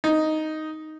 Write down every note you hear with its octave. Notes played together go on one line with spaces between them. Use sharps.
D#4